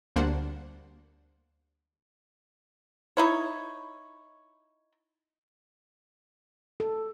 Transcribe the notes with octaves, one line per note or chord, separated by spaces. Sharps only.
D2 G3 A#3 D4 C5 F#5
D#4 E4 C#5
A4